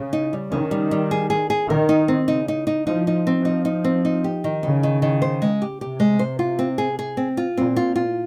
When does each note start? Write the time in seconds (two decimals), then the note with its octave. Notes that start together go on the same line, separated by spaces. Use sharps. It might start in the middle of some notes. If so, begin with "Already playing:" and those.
Already playing: C#3
0.13 D#4
0.33 G3
0.51 D#3 C#4
0.71 G3
0.91 G3
1.11 G#4
1.30 G#4
1.50 G#4
1.69 D#3 A#4
1.89 D#4
2.08 C4
2.28 C#3 D#4
2.48 D#4
2.67 D#4
2.87 F3 D#4
3.07 D#4
3.27 C4
3.45 F3 D#4
3.65 D#4
3.84 C4
4.05 D#4
4.24 G4
4.44 D#3
4.63 C#3 D#4
4.83 D#3
5.02 D#3
5.22 C5
5.42 G#3
5.62 G4
5.80 C3 G4
6.00 G#3
6.19 C5
6.39 F4
6.59 C4
6.78 G#4
6.99 G#4
7.17 C4
7.37 F4
7.57 A#2 C4
7.76 F4
7.96 F4